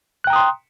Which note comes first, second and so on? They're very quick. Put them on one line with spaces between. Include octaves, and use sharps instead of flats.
F#6 G5 A#5 D#6 C6